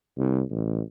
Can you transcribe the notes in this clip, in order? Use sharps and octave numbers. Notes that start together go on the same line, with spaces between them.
C2
A1